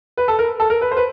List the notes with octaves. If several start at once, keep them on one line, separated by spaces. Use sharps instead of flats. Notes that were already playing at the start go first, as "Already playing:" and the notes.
B4
A4
A#4
A4
A#4
B4
C5
B4